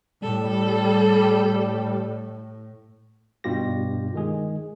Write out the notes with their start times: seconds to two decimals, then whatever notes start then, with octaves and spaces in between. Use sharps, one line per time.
0.22 A2 G3 A4
3.44 G2 B2 F4 G4 A#6
4.14 D#3 G#3 G#4